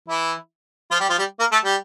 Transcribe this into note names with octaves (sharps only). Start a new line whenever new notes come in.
E3 E4
F3 F4
G3 G4
F3 F4
G3 G4
A#3 A#4
A3 A4
G3 G4